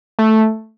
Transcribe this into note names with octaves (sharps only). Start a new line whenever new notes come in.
A3